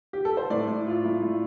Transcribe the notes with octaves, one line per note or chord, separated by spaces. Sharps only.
G4
A4
C5
A2 D5
A2
F4
A2
A2